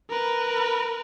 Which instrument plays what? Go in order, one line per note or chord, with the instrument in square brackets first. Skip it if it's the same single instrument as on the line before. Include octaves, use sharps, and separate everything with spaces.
[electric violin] A#4 B4